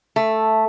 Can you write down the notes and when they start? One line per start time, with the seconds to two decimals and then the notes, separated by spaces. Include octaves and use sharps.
0.16 A3